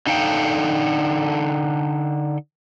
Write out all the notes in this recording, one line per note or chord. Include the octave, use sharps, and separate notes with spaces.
D3 D#4 A4 F5 G5